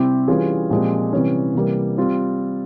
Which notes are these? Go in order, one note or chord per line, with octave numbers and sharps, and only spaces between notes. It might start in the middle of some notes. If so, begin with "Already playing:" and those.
Already playing: C3 G3 C4 E4 G4
E3 G3 C#4 F4 G#4
A#2 F3 G#3 C4 G4
C3 E3 G3 C#4
C3 E3 G3 A#3
G3 C4 F4